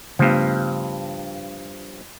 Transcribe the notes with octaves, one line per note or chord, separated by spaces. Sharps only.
G2 C#3 F3 A3 B3